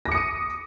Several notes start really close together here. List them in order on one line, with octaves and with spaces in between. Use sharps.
A#6 D6 C#7 D#6 D#7